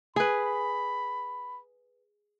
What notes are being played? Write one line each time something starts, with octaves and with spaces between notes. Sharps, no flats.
G#4 B4 B5